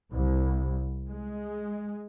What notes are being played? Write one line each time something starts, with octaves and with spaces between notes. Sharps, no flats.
C2
G#3